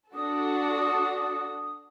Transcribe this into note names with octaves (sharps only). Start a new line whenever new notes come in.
D4 F#4 A4 D#6